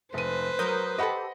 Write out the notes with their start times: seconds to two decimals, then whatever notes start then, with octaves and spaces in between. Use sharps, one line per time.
0.14 F1 B4 C5 D#7
0.59 F#3 A#4 D#6 G6
0.98 G4 A4 D#5 F#5 B5